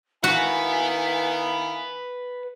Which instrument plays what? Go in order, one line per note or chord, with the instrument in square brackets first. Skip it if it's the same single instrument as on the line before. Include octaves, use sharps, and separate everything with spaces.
[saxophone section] D#3 E4 F5 [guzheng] F#4 [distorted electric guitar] B4 F#5 [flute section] G#5